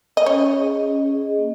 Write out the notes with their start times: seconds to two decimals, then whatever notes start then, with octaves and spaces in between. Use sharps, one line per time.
0.17 D#5
0.26 C#4 C#5
0.54 G#4 D#5
0.83 C#4
1.10 G#4 D#5
1.38 A#3